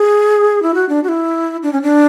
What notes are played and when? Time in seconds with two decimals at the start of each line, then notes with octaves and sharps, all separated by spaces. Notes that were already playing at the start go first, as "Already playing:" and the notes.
Already playing: G#4
0.63 E4
0.74 F#4
0.89 D4
1.04 F#4
1.09 E4
1.63 D4
1.73 C#4
1.82 D4